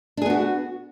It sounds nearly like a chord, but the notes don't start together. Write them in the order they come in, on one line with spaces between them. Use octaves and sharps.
D4 G#4 B3 F#4